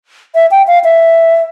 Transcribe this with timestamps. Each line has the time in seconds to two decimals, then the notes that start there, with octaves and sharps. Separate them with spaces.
0.35 E5
0.51 G5
0.67 F5
0.84 E5